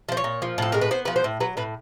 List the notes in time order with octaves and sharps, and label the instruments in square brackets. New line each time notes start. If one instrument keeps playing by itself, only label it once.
[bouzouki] F3 C5
C#5
A#2
F3
A2 A4
G#3 A#4
B4
B3 C5
F3 B4
C5
A2
F#3 B4
A2 B4